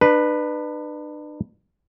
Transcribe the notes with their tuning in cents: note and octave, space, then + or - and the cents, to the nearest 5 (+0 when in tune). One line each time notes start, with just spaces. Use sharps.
D4 +40 B4 +0